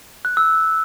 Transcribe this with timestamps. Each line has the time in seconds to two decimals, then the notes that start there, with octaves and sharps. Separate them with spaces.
0.25 F#6
0.37 E6